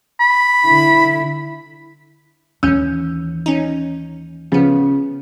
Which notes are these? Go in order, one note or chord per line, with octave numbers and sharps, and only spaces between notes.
B5
D3 E4
D#2 E3 C#4 E6 G6
C#4 D#4
C#3 F3 B3